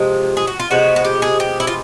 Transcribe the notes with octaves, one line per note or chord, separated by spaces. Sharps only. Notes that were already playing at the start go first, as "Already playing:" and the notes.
Already playing: C3 F3 G#3 F4
G#4
F#4
F4
C3 F3 G#3 B3 F#4
F#4
G4
G#4
G4
E4
F4